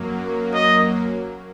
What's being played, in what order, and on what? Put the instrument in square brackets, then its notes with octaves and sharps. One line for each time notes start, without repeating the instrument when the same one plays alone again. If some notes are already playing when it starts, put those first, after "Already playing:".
Already playing: [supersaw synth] F#2 F#3 A#3
[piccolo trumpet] D#5